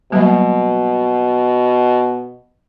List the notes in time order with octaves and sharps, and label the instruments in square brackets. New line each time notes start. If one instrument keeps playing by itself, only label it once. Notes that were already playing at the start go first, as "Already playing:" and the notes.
[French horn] B2 [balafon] F#3 G3 A#3